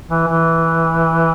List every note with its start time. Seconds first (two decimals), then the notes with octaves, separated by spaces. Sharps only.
0.09 E3
0.27 E3